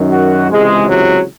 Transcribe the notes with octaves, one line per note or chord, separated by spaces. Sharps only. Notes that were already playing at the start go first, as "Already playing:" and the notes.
Already playing: F#2 D#3
F#4
C#2 C3 E3 G#3
F#3